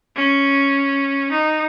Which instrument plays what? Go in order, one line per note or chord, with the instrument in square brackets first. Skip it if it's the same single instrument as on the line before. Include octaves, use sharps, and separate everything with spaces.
[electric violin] C#4
D#4